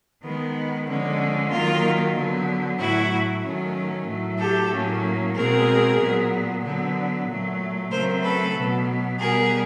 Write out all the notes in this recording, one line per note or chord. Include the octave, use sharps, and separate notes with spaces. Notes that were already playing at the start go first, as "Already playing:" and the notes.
D#3 G#3 B3
D3 F3 G#3 C#4
D#3 F#3 A#3 F4
D3 F#3 B3
A2 F#3 A3 E4 F#4
D#3 F#3 A3 C#4
A2 F#3 A3
G4 A4
A2 F#3 A#3 C#4
B2 G#3 C4 G#4 A#4
A#2 F#3 B3
D3 F#3 B3
A#2 F#3 A3
C#3 F#3 A3 C4 A#4 C5
A4 B4
B2 F#3 B3
B2 G3 B3 G#4 A#4